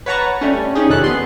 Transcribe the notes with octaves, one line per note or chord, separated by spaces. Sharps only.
B4 C#5 F#5 A5 A#5 C#6
G3 A3 C#4
C#4 D#4 G4 G#4
F2 C3 D#3 A4 F#6
B3 C6